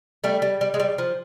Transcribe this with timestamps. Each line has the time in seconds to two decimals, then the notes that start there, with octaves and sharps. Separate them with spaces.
0.24 G3 A3
0.42 G3
0.61 G3
0.74 G#3
0.80 G3
0.98 F3